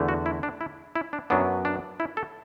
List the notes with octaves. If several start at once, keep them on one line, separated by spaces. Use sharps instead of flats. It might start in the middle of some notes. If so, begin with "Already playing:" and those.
Already playing: E2 D3 A3
F#4
E4
D4
E4
E4
D4
F#2 F#3 B3 D4
D4
E4
A4